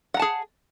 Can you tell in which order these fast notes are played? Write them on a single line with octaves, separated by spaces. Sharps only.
F#5 A#5 A5 G#4